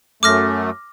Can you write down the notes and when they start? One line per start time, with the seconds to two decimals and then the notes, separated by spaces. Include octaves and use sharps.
0.23 F#2 A3 D6 F6 A#6